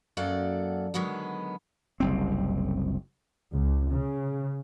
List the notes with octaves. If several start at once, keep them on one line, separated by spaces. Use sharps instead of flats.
F#2 F#3 A#3 A4 D5 F#5
D3 D#3 F#3 G#3 B3
F#1 C2 C4
C#2
C#3